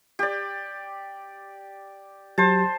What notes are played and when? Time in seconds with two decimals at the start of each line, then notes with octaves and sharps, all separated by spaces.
0.19 G4 D5
2.38 F#3 G4 C5 A5